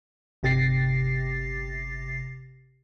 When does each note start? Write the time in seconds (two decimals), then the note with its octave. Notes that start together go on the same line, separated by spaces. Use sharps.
0.43 G1 C3 G4 A6 A#6 C7